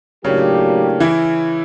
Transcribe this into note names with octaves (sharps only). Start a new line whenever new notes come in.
A2 C#3 F#3 A#3 C#4 D4 G4
E3 E4